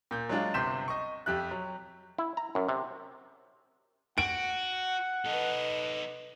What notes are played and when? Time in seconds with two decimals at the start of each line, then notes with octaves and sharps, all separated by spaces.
0.11 A#2 G6
0.29 F#3 G#3 D4 F4
0.54 G1 C3 C6 G6 B6 E7
0.88 D#5 C#6
1.26 F2 G4 E5 F#6
1.51 F#3
2.18 E4
2.37 A#5
2.55 F#2
2.69 C3
4.18 F#4 F#5 D7
5.26 D#4 A4 B4 D#5